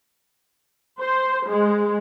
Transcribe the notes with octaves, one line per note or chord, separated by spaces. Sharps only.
C5
G#3